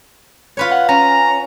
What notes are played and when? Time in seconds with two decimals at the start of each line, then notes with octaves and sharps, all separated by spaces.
0.57 F4 B4 C#5
0.71 F#5
0.89 C#4 A#5